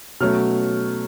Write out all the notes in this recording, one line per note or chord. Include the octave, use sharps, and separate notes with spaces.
B2 F#3 A3 C#4 F6